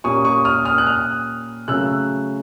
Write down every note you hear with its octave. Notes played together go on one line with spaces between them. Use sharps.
A#2 G3 A#3 C#4 C#6 D#6
C#6 D#6
D#6 F6
D#6 F6
F#6
D#6 F6
C#3 F#3 A3 E6 F#6